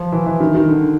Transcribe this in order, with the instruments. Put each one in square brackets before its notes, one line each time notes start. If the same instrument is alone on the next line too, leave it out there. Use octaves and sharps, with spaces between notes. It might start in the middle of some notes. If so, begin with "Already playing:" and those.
Already playing: [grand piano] F3
E3
E3
D#3
D#3
D3